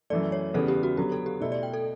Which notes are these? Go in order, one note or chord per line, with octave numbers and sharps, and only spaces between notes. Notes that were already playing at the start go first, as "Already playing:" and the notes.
F#2 E3 A3 D5
C#5
E2 C#3 G3 B3 A4
G4
F#4
D3 F#3 B3 G4
A4
G4
B2 A3 E4 D5
D5
G5
A4